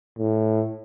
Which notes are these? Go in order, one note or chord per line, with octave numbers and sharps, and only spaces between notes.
A2